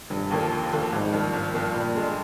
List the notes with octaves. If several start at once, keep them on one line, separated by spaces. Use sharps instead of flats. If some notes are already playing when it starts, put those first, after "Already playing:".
F1 G2
D#2 D3 F3 A#3
F1
D#2 D3 F3 A#3
G#1 G#2
G2 F3 A#3
G#1
G2 F3 A#3
G2 A#2
D3 G#3 D4